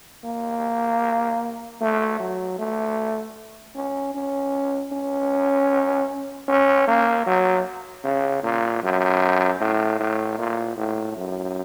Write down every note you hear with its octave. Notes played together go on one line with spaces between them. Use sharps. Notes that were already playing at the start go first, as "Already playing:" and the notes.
A#3
A3
F#3
A3
C#4
C#4
C#4
C#4
A#3
F#3
C#3
A#2
F#2
A2
A2
A#2
A2
F#2